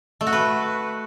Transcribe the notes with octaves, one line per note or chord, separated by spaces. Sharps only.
A3
F#4
B4